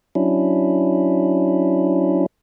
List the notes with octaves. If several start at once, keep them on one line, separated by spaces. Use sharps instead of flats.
F#3 C#4 D4 E4